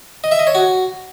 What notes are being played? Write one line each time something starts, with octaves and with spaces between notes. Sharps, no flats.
D#5
E5
D#5
C#5
F#4